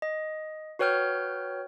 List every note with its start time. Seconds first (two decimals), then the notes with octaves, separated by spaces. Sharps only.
0.02 D#5
0.79 F#4 B4 C#5 G5 F6 G6